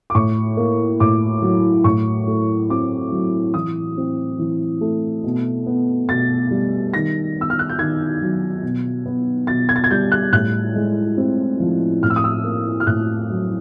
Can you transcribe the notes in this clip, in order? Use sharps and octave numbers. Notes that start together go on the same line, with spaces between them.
D6
A2 C#6
A#3
A2 D6
F#3
A2 C#6
A3
C4 D6
F#3
E3 D#6
C4
E3
A3
B2
B3
B2 A6
G3
D#3 A#6
B3
E6
F6
F#6
G6
D#3 G#6
F#3
B2
B3
B2 A6
G#6
A6
G#6
G3 G6
F#6
A2 F#6
G#3
C4
F3
A2 F6
E6
D#6
E6
A#3
F6
A2 F#6
F#3